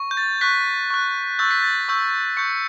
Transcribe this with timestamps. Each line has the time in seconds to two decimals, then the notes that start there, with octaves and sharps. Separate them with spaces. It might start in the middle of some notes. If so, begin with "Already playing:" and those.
Already playing: C#6
0.11 G6
0.17 A6
0.41 C#6 F#6 B6
0.90 C#6 F#6
1.39 C#6 E6 G6 A6
1.51 B6
1.62 A6
1.89 C#6 E6 G6
2.37 C#6 G6 C#7